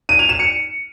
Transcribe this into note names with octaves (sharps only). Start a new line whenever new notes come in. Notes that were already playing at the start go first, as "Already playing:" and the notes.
D#7
F7
E7
C#7